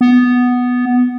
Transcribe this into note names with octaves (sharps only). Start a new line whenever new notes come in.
B3